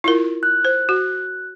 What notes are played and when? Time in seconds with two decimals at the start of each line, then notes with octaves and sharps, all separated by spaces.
0.04 E4 F4 A#4
0.43 F#6
0.65 C5
0.89 F#4